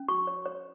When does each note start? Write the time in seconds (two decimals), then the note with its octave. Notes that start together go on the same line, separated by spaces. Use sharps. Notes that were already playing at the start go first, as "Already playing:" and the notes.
Already playing: C#4
0.08 F#4 C#6
0.27 C#5
0.46 C#5